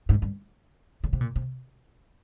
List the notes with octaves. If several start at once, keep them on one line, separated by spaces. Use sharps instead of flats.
G#2
G2
C#3
C3
A#2
C3